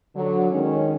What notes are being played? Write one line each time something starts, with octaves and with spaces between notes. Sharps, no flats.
D3 F#3
D#3 G#3 C#4